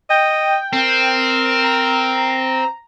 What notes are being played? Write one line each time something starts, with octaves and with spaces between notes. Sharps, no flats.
D#5 G5
C4 A#4
A#5